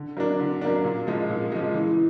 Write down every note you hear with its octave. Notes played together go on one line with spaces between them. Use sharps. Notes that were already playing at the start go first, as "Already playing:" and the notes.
Already playing: D3
F#3 A#3 D4
D3
F#3 A#3 D4
A#2
F3 G#3
A#2
F3 G#3
E3